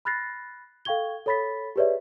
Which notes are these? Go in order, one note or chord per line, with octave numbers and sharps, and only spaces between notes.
B5 F6 F#6 A6 A#6 C7
A4 F5 G5 C#6 G#6 G7
A4 C#5 B5 A6 B6
G4 G#4 B4 C#5 D5 E5